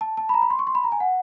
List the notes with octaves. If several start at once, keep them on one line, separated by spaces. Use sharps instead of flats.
A5
A5
B5
A#5
B5
C6
C#6
C6
B5
A#5
G#5
F#5